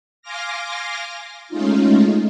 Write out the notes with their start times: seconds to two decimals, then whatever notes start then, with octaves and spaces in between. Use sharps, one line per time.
0.22 F5 G#5 C6 D6 F6 A#6
1.49 G#3 A3 C#4 D#4 F4